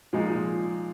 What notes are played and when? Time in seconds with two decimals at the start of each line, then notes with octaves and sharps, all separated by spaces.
0.13 A#2 F3 G#3 D#4